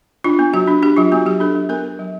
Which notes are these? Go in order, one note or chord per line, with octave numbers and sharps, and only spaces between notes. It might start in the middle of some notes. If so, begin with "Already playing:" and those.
D4 F4
B3
F#3 F#4
D4
D4 G4
F#3 F4
B3 F#4
F#3 G4
D4 A4
F#3
B3 A#4
B3
F#3